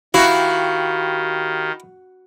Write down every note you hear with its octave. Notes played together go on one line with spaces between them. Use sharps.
D#3 E4 F#4 G4 F5